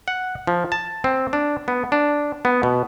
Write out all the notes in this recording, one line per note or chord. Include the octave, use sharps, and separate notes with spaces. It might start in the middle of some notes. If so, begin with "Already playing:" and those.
F#5
F3
A5
C4
D4
B3
D4
B3
B2